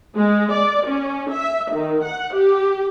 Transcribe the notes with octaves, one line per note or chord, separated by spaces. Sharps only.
G#3
D5
C#4
E5
D#3
F#5
G4